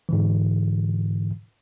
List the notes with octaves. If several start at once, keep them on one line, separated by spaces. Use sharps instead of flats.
G#2 D3 E3